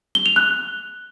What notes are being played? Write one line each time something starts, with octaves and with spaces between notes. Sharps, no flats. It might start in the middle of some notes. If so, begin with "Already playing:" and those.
G7
F7
F#6